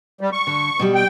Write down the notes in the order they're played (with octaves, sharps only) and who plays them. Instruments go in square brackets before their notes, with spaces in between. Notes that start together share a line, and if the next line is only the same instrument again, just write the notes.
[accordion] G3
C#6
[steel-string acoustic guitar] D3
B2 G3
[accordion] G5